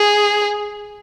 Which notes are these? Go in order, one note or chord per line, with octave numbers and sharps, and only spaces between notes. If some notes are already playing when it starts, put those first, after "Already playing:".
Already playing: G#4